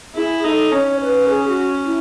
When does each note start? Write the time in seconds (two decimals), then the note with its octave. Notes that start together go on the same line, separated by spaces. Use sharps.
0.15 E4 G#4
0.44 D#4 A4
0.72 C#4 C#5
1.00 B4
1.29 G#4
1.48 F#4
1.86 E4